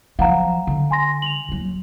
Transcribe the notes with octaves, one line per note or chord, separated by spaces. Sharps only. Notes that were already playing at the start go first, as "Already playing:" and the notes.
F3 F#3 F5 F#5 A#5
D3
G#5 C6 A#6
F7 F#7
D#2 F#3